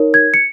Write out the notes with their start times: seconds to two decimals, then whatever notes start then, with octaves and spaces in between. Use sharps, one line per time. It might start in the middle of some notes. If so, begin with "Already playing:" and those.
Already playing: D#4 A#4 C#5
0.14 G#6
0.34 C#7